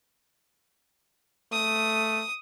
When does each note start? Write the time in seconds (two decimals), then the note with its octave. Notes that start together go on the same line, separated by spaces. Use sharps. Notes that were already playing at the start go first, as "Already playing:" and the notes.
1.52 A3 D#6